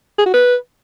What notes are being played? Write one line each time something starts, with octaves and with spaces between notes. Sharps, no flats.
G#4
F#4
B4